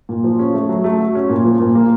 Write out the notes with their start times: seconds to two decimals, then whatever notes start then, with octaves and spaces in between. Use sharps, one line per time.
0.09 A#2
0.24 F3
0.39 C#4
0.54 A3
0.69 F#3
0.84 A3
0.99 F#4
1.15 C#4
1.30 A#2
1.44 F3
1.59 A#2
1.75 A#3